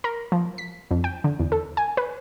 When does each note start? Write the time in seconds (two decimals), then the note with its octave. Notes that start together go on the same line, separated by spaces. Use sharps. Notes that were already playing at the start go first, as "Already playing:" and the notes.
0.04 A#4
0.32 F3
0.58 B6
0.91 F2
1.04 G5
1.24 D3
1.39 E2
1.52 A4
1.77 G#5
1.97 B4